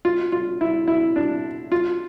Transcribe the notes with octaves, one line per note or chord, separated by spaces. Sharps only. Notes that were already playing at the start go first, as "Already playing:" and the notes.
F4
F4
E4
E4
D4
F4